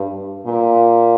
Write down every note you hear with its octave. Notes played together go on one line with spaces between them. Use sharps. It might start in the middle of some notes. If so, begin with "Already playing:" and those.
Already playing: G2
A#2